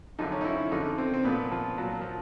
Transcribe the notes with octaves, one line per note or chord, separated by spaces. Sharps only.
F#2 D3 F3 D#4
C#4
D#4
E4
E4
F2 D3 F3 D#4
C4
C4
A#2 F3 B3
F3
A#2 F3 F#3
F3